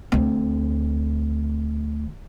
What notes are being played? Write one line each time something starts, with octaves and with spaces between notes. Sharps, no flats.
D2 C4